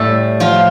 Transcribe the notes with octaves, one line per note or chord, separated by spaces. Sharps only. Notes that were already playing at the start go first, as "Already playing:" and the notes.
Already playing: A2 G3 A3 A4
F3 F4